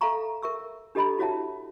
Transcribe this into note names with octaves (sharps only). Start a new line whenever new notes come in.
A4 E5 F5 A#5 C#6
A#4 E5 C#6 E6
D4 G4 A4 D#5 A#5 B5
E4 F#4 C#5 E5 F#5 A5